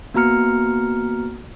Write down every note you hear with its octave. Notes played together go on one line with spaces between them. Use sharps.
A#3 B3 F#4 A#5 F6 C#7